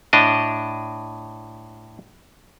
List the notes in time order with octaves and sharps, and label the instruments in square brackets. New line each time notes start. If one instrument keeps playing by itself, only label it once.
[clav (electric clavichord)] A2 D4 D#5